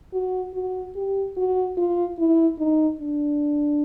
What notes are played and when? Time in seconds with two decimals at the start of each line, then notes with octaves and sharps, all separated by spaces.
0.13 F#4
0.54 F#4
0.96 G4
1.37 F#4
1.77 F4
2.19 E4
2.59 D#4
3.01 D4